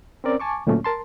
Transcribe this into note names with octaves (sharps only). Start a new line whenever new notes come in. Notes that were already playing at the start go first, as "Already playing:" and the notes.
C4 C#4 A#4 D5
G#5 A5 C#6 D6
D2 A#2 F#3 A3 A#3 C#4
A#4 A5 C6